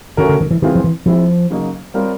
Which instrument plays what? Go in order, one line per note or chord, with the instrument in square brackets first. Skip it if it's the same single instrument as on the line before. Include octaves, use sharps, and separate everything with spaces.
[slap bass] D#3 [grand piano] A3 C#4 F#4 A#4
[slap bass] D3
D#3
E3
[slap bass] D#3 [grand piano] E3 G#3 C4 F4
[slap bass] F3
E3
[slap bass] F3 [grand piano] G#3 C4 E4
[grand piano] C#3 F#3 A#3 D#4
G3 C4 F4 A#4 C#5